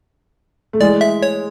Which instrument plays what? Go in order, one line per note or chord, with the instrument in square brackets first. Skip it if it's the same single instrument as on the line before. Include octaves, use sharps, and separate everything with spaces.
[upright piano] A3
[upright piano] E3 G#3 [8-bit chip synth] D5
[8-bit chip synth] E5
C#5